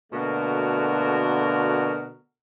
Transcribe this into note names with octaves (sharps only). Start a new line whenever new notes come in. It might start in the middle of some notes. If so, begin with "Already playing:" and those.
B2 D3 A3 A#3 F#4 A#4